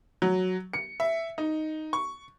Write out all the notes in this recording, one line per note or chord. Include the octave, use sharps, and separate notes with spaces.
F#3
C#7
E5
D#4
C#6